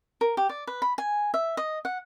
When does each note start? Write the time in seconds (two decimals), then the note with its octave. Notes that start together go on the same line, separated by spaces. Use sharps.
0.21 A#4
0.37 G4
0.49 D5
0.67 B4
0.82 B5
0.98 G#5
1.34 E5
1.57 D#5
1.85 F#5